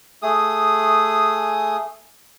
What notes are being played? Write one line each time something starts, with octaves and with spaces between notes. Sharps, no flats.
A3 G#4 D#6